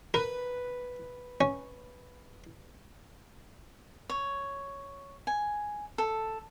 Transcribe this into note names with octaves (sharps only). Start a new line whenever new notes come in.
A#4 B4
C#4
C#5
G#5
A4